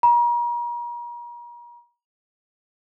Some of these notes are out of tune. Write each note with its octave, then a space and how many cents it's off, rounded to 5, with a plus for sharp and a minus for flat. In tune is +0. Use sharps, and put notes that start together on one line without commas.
A#5 +40